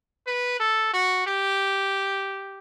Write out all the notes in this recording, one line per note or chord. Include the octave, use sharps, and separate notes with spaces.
B4
A4
F#4
G4